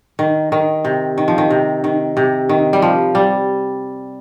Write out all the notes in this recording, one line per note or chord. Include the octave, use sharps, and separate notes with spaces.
D#3
D#3
C3
D#3
F3
D#3
C3
D#3
C3
D#3
G3
F3
G3